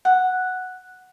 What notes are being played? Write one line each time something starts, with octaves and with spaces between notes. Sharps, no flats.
F#5